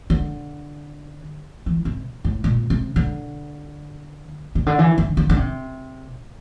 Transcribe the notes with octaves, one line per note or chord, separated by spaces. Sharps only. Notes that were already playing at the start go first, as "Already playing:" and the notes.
D3
E3
C3
A2
A#2
C3
D3
C3
D3
E3
D3
D3
D3
C3